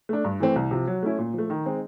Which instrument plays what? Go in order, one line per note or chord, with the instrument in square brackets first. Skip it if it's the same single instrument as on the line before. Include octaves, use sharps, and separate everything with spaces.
[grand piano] A3 D4
G2
E3 A3 C4
C2
C3 F3
F#3
A3 C#4 E4
A#2
F3 A3
D#3
G#3 C4 D#4